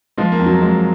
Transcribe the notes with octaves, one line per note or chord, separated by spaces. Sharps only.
F3 G#3
A#3
F2
F#3
F2 G#3